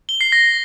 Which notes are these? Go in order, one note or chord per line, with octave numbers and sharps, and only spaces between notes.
G7
C7
A#6